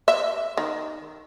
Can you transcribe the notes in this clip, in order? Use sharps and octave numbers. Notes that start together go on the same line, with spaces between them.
E5
D#3